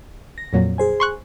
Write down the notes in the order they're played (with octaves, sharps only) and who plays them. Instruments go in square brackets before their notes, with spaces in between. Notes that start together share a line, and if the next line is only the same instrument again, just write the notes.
[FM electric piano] A#6
[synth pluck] F2 A#2 F#3
[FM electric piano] G#4 C5 G#5
[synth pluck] C6 C#6 F#6